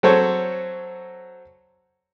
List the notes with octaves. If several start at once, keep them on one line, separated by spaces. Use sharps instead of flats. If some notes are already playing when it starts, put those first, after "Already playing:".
F#3 C4 A4 C5 C#5